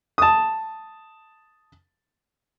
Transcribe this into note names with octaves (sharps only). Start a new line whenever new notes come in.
A5 D#6